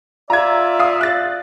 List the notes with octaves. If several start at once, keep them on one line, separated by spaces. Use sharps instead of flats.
F4 D5 E5 A#5 G#6
F5 D#6
F#6 A6